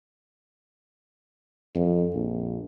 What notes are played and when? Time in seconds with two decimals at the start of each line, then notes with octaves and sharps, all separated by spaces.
1.75 F2
2.15 A#1